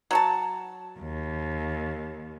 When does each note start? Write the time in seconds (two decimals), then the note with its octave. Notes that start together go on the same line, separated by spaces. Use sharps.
0.11 F#3 F#4 A5
0.99 D#2